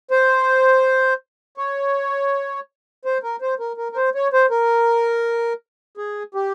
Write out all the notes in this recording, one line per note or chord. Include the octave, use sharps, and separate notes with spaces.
C5
C#5
C5
A#4
C5
A#4
A#4
A#4
C5
C#5
C5
A#4
G#4
G4